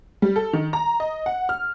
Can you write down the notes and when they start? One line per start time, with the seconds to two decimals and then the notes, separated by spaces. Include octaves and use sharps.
0.22 G3
0.36 A4
0.53 D#3
0.73 A#5
1.00 D#5
1.26 F#5
1.49 F6